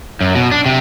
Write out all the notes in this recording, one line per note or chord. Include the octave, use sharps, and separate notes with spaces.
F#2
B2
D4
C3